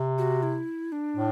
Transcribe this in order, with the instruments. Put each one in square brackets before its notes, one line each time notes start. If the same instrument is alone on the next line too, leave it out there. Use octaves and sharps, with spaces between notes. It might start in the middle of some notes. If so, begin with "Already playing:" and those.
Already playing: [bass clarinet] C3
[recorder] F#4
E4
D4
[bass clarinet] A2